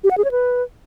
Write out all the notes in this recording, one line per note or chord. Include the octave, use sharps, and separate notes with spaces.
G4
F#5
G#4
C#5
B4